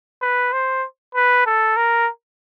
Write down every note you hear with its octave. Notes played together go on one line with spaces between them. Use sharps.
B4
C5
B4
A4
A#4